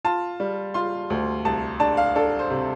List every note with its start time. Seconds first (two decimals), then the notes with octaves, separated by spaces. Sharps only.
0.05 F4 A5
0.40 G3
0.74 F4 C6
1.10 D2
1.45 C2 A5
1.80 D4 A5
1.97 F5
2.15 D4 A4
2.39 C5
2.50 C3